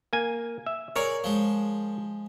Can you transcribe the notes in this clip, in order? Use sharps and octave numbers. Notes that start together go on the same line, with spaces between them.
A#3 G#5
E5
G#4 A#4 C#5 D5
F3 G#3